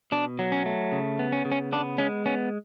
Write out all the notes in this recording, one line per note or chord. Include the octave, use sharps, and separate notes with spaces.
B2 D4
F#3
C#4
A3
C#3
B3
C#4
C#3
C#4
B3 D4
G#3 C#4
B3 C#4